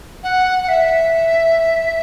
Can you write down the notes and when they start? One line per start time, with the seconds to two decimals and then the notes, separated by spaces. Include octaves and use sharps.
0.23 F#5
0.64 F#5
0.69 E5